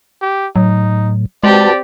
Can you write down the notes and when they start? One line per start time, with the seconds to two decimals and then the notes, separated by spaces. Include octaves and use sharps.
0.21 G4
0.56 A2 F#3 D#4
1.43 G#3 C4 F#4 G4 B4 D5 A5